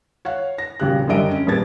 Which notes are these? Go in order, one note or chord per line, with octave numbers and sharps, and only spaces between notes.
C#5 F5 F#5
A#6
D#1 G#1 C#3 G4 F#6
F#2 D3 F#3 G3 D#5 D7
C#4
D#1 G#3 B3 G#6 A6